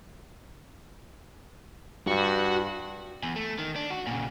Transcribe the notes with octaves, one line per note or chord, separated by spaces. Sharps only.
G2 F#4
E2
A3
D#3
D4
F#4
A#2 C#3